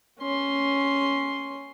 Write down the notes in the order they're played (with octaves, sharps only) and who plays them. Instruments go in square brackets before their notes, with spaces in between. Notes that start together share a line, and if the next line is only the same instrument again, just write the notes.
[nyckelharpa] C#4 C6